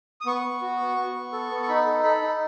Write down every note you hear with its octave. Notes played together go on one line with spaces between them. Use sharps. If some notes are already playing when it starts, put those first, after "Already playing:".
D#6
B3 C#6
B3
F#4
B3
B3
B3
A4
B3
C#6
D#4 B5
A4
A4 B5
D#4